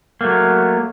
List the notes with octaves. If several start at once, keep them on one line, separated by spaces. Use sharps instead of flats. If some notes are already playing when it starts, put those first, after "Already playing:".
F#3 A3 A#3